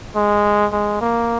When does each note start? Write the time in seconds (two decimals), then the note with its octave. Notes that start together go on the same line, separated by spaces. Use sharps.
0.16 G#3
0.72 G#3
1.01 A#3